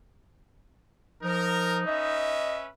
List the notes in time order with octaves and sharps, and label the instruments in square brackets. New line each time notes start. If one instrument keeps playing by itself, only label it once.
[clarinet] F3 [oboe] D#4 [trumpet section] A#4
[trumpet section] C#4 B4 E5 [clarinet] D#5